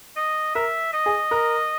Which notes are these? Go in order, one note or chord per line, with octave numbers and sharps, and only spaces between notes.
D#5
A#4 E5
D#5
G#4
A#4